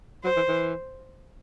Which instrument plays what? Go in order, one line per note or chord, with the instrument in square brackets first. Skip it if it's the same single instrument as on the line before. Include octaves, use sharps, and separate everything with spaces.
[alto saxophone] F#3 [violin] C5
[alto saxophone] E3
E3